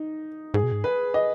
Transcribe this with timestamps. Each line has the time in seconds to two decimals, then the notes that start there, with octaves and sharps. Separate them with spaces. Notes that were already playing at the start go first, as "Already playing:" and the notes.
Already playing: D#4
0.54 G#2 G#4
0.63 B2
0.72 G#2
0.84 B4
1.14 D#5